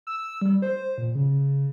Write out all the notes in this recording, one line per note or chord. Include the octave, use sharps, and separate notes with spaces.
E6
G3
C5
A#2
C#3